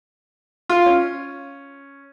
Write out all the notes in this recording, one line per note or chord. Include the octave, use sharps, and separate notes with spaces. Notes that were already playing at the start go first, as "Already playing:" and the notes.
F4
C#4